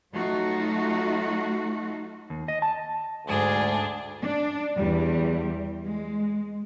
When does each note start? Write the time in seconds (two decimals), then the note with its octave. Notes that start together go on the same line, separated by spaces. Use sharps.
0.13 F#3 A3 D#4 F4 F#4
2.30 D#2
2.48 D#5
2.62 A5
3.27 D2 G#2 D4 G#4
4.22 D4
4.79 E2 G3
5.87 G#3